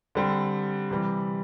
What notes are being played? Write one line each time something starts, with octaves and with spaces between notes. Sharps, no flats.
D3 G3 C4
C3 E3 G3